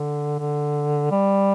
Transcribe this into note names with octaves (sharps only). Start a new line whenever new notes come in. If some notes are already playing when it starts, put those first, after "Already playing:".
Already playing: D3
D3
G3